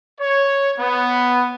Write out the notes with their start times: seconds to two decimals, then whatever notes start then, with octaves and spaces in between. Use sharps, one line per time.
0.20 C#5
0.78 B3